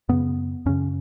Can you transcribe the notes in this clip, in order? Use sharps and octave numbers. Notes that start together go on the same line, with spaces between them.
F#2 C#3 B3
F#2 C#3 C#4